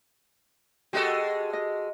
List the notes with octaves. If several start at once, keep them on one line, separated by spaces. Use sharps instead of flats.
G#3 F#4 G4 A4 D#5
D#5